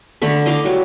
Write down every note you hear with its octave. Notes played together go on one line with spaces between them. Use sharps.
D3 A3 B5
E4 D#5 F5 D6
F#3 G3